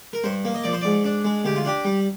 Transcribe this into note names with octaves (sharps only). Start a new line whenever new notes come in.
A#4
G2 C5
A#3
D#5
F3 D5
C5
G#2 D5
D4
G#3
D2 G4
F4
D4 G4
G3